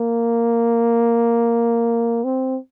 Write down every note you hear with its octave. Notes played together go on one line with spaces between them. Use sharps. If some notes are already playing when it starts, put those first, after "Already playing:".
Already playing: A#3
C4